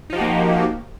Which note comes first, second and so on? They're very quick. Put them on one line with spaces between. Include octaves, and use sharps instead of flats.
D#4 F3 G4 F#4 A#3